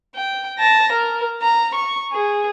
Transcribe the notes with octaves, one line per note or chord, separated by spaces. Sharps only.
G5
A5 A#6
A#4
A#5
C#6
G#4